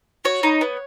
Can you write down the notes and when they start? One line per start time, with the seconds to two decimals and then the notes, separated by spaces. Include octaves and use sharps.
0.25 F#4 C#5
0.43 D#4
0.61 B3